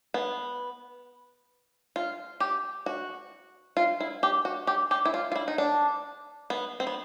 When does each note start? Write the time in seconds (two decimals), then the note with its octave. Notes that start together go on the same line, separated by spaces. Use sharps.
0.14 B3
1.96 F4
2.40 G4
2.86 F#4
3.77 F4
4.00 E4
4.23 G4
4.45 F#4
4.67 G4
4.91 G4
5.05 E4
5.14 F4
5.32 F4
5.36 E4
5.48 D#4
5.58 D4
6.50 B3
6.80 C4
6.87 B3